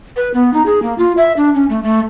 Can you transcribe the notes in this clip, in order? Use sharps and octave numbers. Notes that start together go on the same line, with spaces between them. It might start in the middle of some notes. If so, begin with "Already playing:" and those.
B4
B3
D#4
G#4
A#3
F4
E5
D4
C#4
A3
A3